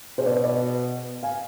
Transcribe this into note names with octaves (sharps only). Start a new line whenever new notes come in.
B2 G#4 C5
B4 D5
B4 D5
F5 G#5